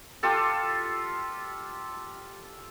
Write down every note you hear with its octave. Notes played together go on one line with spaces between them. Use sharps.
F4 G4 A4